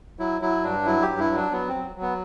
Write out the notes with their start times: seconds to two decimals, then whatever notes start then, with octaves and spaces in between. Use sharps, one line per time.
0.19 F#3 E4
0.41 F#3 E4
0.63 G2 D4
0.85 F#3 E4
1.02 G4
1.07 G2
1.19 E4
1.30 F#3
1.35 D4
1.51 F#3 B3
1.69 C4
1.74 F#3
1.96 F#3
2.02 B3